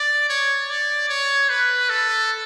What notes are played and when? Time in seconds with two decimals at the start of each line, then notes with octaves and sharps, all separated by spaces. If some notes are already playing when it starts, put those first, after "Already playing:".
Already playing: D5
0.29 C#5
0.70 D5
1.09 C#5
1.49 B4
1.89 A4